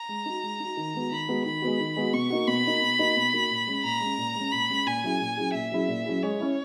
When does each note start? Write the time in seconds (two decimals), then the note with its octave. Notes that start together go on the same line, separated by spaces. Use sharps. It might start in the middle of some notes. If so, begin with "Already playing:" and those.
Already playing: A#5
0.09 G#3
0.26 D#4 F#4
0.44 G#3
0.60 D#4 F#4
0.77 D#3
0.94 G#3 B3 F#4
1.11 D#3 B5
1.28 G#3 B3 F#4
1.45 D#3 B5
1.62 G#3 B3 F#4
1.80 D#3
1.97 G#3 B3 F#4
2.14 B2 C#6
2.30 A#3 D#4 F#4
2.47 B2 B5
2.65 A#3 D#4 F#4
2.82 B2
2.99 A#3 D#4 F#4
3.17 B2
3.34 A#3 D#4 F#4
3.51 A#2
3.67 G#3 C#4
3.84 A#2 A#5
4.01 G#3 C#4
4.18 A#2
4.35 G#3 C#4
4.52 A#2 B5
4.70 G#3 C#4
4.86 A#2 G#5
5.04 F#3 C#4 E4 G#4
5.21 A#2
5.37 F#3 C#4 E4 G#4
5.54 A#2 E5
5.72 F#3 C#4 E4 G#4
5.88 A#2
6.06 F#3 C#4 E4 G#4
6.22 G#3 C#5
6.40 C#4 E4